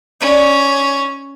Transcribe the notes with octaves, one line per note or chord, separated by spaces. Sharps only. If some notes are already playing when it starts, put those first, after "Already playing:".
C#4 D#4 C#5 D5